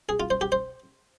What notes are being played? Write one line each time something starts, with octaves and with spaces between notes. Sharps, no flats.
G#4
F4
C5
G4
C5